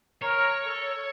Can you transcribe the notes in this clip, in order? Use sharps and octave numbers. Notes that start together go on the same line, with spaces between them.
A#4 C#5
A4